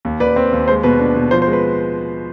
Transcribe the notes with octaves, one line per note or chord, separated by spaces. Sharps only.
D#2
D#2 B4 D5
C4
D#2
G#3 C5
B2 B4
D4
B2
F3 C5
C5
G#3
B4